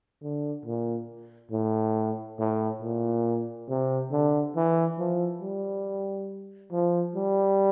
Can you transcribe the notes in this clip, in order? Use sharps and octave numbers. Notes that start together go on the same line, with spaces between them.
D3
A#2
A2
A2
A#2
C3
D3
E3
F3
G3
F3
G3